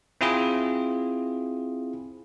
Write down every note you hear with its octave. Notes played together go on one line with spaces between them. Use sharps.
C4 E4 F4 G#4